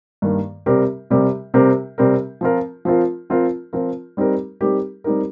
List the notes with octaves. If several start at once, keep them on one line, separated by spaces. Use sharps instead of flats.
G2 D#3 A#3
C3 G3 C4 G4 A#4
C3 G3 C4 G4 A#4
C3 G3 C4 G4 A#4
C3 G3 C4 G4 A#4
F3 C4 F4 A#4
F3 C4 F4 A#4
F3 C4 F4 A#4
F3 C4 F4 A#4
G3 C4 D#4 G4 A#4
G3 C4 D#4 G4 A#4
G3 C4 D#4 G4 A#4